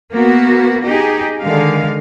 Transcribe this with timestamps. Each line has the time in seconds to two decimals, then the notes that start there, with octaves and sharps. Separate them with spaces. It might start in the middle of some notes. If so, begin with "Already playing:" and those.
0.11 A#3 B3 F#4
0.84 D#4 G4 G#4
1.41 D3 D#3 G#3 F5